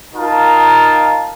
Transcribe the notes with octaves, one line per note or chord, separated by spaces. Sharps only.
D#4 F4 A#4 A5